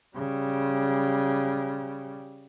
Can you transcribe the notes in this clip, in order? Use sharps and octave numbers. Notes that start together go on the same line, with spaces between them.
C#3 G3